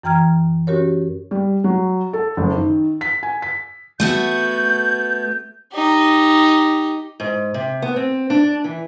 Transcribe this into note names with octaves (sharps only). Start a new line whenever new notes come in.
F#2 E3 G5 A#5 F6 G#6
C#4 F#4 G4 A#4 C#5
G3
F#3
A4
F#1
D#3
B6
G#5
B6
A3 B3 F#4 G6
D#4 G4
G#2
C3
B3
C4
D4
E3